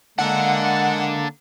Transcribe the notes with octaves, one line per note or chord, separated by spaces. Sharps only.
D3 G#3 A#3 D4 A4 F#5